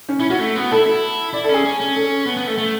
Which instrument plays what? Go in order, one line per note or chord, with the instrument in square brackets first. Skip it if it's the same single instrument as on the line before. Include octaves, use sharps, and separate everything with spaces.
[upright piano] C#4
[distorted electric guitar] C#4 [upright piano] E4
[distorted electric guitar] C#4 [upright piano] F#4
[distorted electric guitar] A3
B3
[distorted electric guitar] E4 [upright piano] A4
[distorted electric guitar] E4
[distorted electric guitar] E4 [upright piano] D5
[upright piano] A4
[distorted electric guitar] C#4 [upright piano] G#4
[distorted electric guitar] C#4
C#4
[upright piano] A4
[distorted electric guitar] B3
B3
A3
A3